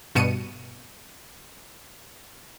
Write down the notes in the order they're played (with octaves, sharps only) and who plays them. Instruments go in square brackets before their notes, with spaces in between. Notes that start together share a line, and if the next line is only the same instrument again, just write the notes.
[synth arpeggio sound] G2 B2 C#7 D#7